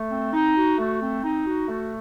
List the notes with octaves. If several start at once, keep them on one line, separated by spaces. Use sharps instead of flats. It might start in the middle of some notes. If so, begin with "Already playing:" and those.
Already playing: A3
C4
D#4
F#4
A3
C4
D#4
F#4
A3